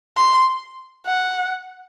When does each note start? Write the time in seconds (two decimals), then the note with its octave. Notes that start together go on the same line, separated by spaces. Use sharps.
0.17 C6
1.07 F#5